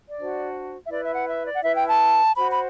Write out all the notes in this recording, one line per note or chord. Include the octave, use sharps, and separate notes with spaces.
D5
D4 F#4 C5
E5
E4 B4 D5
E5
F#5
E5
D5
F#5
E4 B4 E5
G5
A5
F#4 C5 B5
B5